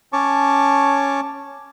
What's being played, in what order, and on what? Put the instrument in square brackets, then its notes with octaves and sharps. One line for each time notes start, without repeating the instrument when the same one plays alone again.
[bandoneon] C#4 C#5 A5 C#6 D6